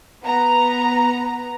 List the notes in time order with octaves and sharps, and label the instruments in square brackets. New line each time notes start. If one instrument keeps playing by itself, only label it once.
[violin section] B3 A#5